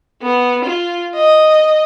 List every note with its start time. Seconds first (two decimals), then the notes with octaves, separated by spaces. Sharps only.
0.22 B3
0.65 F4
1.14 D#5